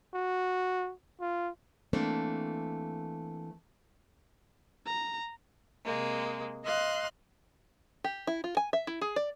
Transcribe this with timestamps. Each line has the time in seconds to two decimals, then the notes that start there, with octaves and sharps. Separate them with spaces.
0.14 F#4
1.21 F4
1.93 E3 A3 A#3 C4 D4
4.86 A#5
5.84 C3 G#3 A#3
6.63 D#5 F5 C6 F#6
8.04 G4
8.27 E4
8.44 F4
8.57 G#5
8.73 E5
8.87 E4
9.01 G#4
9.16 D5